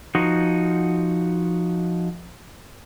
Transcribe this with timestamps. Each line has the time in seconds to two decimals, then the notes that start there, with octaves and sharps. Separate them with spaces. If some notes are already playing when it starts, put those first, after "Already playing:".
0.15 F3 D#4 F#4